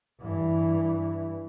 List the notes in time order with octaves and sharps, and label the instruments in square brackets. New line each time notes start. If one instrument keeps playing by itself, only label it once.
[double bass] G2 E3